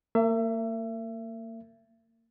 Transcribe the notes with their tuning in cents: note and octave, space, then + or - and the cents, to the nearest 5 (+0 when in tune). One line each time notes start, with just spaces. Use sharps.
A#3 -35 E5 +30